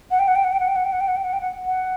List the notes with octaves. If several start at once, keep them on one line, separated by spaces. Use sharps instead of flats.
F#5
G5
F#5
G5
F#5
G5
F#5
G5
F#5
G5
F#5
G5
F#5
G5
F#5
G5
F#5
F#5